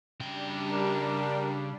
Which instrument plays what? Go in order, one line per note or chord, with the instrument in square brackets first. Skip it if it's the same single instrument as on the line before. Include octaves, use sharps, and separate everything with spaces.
[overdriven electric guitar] C#3 G5 [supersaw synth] G3 D4
[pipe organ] A#4